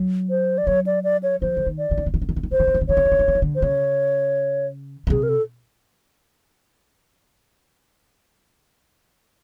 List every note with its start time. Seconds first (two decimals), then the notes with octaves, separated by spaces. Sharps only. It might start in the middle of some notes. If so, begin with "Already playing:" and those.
Already playing: F#3
0.30 C5
0.58 D5
0.67 F#3 C#5
0.86 D5
1.04 D5
1.23 C#5
1.42 F3 C5
1.57 D3
1.67 D#3
1.78 D5
1.91 D3
1.98 D#3
2.06 D3
2.14 D#3
2.22 D3
2.29 D#3
2.36 D3
2.43 D#3
2.51 D3 C5
2.60 D#3
2.67 D3
2.74 D#3
2.81 D3
2.88 D#3 C#5
2.97 D3
3.05 D#3
3.12 D3
3.19 D#3
3.28 D3
3.35 D#3
3.42 D3
3.55 C5
3.62 C#3 C#5
5.07 C#3
5.10 C3 G#4
5.23 A#4
5.29 A4